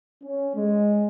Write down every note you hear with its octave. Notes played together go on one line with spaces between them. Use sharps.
C#4
G#3